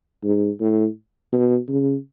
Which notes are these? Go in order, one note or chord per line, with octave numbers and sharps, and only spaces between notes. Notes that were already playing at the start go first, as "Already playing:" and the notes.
G#2
A2
B2
C#3